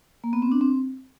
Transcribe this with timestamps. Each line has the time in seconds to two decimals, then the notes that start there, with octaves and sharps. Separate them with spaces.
0.24 A#3
0.33 B3
0.42 C4
0.52 D4
0.61 C4